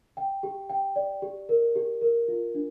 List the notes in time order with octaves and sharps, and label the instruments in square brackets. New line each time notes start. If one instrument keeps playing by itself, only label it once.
[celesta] G5
G4
G5
D5
G4
A#4
G4
A#4
F4
D4